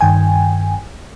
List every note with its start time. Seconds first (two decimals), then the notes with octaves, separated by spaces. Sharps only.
0.01 G2 D#3 G5 G#5